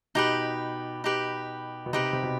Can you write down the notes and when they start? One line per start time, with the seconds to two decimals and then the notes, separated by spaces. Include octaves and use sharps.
0.15 B2 D#4 G4 B4
1.04 D#4 G4 B4
1.86 B2
1.93 C3 D#4 G4 B4
2.13 C3
2.23 B2